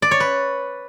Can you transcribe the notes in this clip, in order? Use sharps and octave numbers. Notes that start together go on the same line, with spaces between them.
D5
C#5
B4